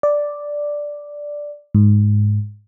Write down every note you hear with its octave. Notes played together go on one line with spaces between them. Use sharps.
D5
G#2